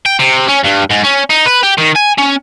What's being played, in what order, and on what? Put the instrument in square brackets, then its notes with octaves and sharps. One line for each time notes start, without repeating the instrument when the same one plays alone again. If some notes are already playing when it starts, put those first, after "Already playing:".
[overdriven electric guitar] G5
C3
C#4
G2
G#2
C#4
D#4
B4
G4
D#3
G#5
C#4